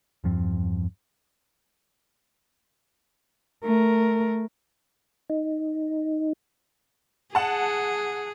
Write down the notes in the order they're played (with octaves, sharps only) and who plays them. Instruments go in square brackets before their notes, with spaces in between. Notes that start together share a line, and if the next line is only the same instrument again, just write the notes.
[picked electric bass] E2 G2 F3 C4
[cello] A3 A#4
[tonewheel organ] D#4
[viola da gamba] G#4 [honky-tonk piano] F#5 A5